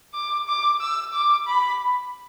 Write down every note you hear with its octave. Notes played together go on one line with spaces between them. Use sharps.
D6
D6
E6
D6
B5